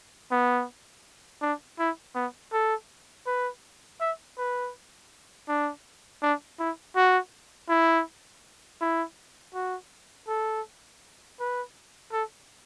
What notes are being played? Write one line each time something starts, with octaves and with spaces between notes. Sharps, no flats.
B3
D4
E4
B3
A4
B4
E5
B4
D4
D4
E4
F#4
E4
E4
F#4
A4
B4
A4